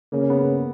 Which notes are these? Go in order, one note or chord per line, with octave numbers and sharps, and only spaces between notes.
C#3 A#3
B3